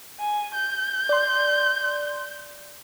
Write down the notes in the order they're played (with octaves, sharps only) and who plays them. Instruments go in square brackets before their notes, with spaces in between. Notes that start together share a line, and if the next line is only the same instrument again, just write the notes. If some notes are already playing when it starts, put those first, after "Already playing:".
[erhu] G#5
G6
[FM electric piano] D5 C6